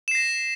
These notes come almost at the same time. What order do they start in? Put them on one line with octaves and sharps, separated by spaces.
E7 C7 A#6